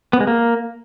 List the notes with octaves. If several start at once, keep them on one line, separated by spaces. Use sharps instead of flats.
B3
G#3
A#3